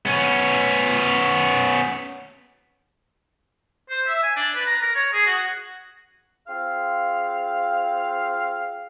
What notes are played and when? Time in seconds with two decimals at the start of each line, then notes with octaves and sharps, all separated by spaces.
0.06 B3 C#4
3.89 C5
4.07 E5
4.23 G#5
4.36 D4
4.55 B4
4.67 A#5
4.81 A#4
4.95 C#5
5.13 G#4
5.27 F#4
6.47 C4 F4 G#4 F5